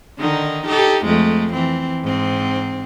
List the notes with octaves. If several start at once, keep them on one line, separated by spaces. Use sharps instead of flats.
D3 D#3 D#4
D#4 G4 A4
F2 G#3 A3
E3 C4
G#2 C4